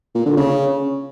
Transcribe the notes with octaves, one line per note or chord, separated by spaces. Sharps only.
A#2
D3
C#3